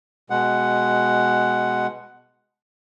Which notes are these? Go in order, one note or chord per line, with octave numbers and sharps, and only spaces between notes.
B2 G#3 F#5